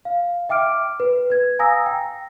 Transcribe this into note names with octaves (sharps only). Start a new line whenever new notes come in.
F5
E5 G5 D6 F6 D7
B4
B4 G#6
F5 G#5 A#5 D#6 E6 A#6
G5